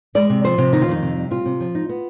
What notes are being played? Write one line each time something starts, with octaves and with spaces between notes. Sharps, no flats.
G#3 D5
C3
F3 C5
C3
D#3 D#4
F4
F2 D#4
C3
G3
C4 F4
C3
F3
D#4
B3